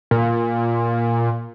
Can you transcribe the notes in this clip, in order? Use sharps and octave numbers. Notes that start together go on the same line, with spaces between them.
A#2